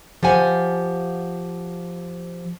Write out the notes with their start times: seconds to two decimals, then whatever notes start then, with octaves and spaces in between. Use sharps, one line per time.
0.23 F3 G4 F#5 G#5